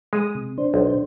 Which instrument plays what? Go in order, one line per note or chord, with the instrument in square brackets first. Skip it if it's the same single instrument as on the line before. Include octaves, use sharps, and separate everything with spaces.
[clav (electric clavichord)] G#3 [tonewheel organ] D#6
[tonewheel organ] C3
D4 C5
[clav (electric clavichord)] B1